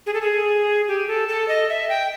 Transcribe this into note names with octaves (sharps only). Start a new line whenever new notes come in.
G#4
A4
G#4
G4
A4
A4
D#5
E5
G5